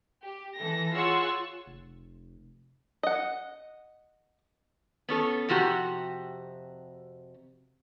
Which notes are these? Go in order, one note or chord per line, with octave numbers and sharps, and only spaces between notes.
G4
E3 A4 A#6
F4 G#4 C#5 F#5 C#6 E6
F1
D#5 F#5
B3 C#4 A4
F2 C3 F#4 G4